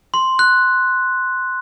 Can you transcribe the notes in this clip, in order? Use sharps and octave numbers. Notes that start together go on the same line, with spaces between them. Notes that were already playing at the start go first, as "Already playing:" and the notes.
C6
F#6